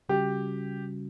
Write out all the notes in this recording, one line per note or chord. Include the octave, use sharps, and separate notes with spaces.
C#3 G3 C#4 F#4 G4